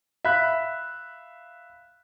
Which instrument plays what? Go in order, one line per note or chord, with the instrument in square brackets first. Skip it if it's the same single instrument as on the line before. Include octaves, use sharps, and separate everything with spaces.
[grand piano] E5 F5 B5 F#6 B6